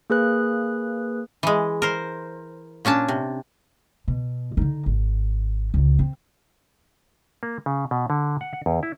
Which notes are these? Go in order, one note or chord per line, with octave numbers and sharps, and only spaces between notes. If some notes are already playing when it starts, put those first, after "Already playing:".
A#3 G#4 B4 F#6
E3 G#3
A#4 C5
A#2 C#4 D4 A5
C3
B2
D3 D#4
G#1
C#2 D3
C4
A#3
C#3
B2
D3
F#5
F#5
E2
E4